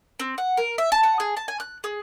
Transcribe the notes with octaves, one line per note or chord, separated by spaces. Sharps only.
C4
F#5
A#4
E5
A5
F#5
G#4
A5
G#5
F#6
G#4